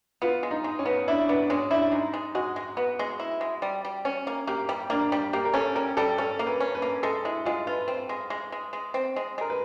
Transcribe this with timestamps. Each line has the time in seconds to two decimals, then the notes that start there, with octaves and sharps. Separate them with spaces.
0.22 B3 F4
0.43 G#3
0.51 D#4
0.64 G#3
0.79 C#4
0.86 B3
1.08 D4 E4
1.29 B3 D4
1.50 G#3 C#4
1.71 D4 E4
1.92 G#3 D#4
2.14 G#3
2.35 G#3 F#4
2.56 G#3
2.77 B3
2.99 G#3
3.20 E4
3.41 G#3
3.62 G3
3.85 G3
4.05 C#4
4.27 A#3
4.47 A#3 G4
4.69 G3
4.90 A#3 D4
5.12 G3
5.33 A#3 G4
5.45 A#4
5.54 C#4 A4
5.75 G3 A#4
5.97 G3 A4
6.18 C#4 A4
6.39 A#3
6.47 B4
6.60 C#4
6.75 B4
6.82 A#3
7.03 G#3 A4
7.25 G#3 E4
7.45 G#3 F4
7.67 F4 B4
7.88 C4
8.09 G#3
8.30 G#3
8.52 G#3
8.73 G#3
8.94 C4
9.16 G#3
9.38 G#3 A#4
9.50 B4